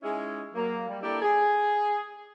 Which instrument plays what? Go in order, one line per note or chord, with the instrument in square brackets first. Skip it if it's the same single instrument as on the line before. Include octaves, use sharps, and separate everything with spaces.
[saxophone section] G#3 C#4 D#4 E4 G#4
F#3 A#3
G3
A#3 D4 E4 G4 A4 D5
G#4